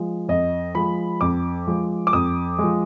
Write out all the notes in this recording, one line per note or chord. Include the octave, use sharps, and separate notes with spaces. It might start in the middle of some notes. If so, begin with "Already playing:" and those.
Already playing: F3 G#3
F2 D#5
F3 G#3 B5
F2 D6
F3 G#3
D6
F2 D#6
G#3
F3